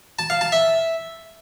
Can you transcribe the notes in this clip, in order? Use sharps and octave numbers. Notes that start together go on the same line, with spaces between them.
A5
F5
A5
E5